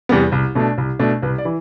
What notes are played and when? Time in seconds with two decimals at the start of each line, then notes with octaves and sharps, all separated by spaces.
0.09 E2 C3 G3 B3
0.32 C2
0.55 B2 A3 D4
0.78 C2
0.99 B2 A3 D4
1.22 C2 B4
1.38 D5
1.45 E3